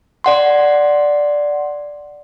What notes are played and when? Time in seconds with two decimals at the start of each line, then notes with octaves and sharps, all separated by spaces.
0.24 D5 F#5 C6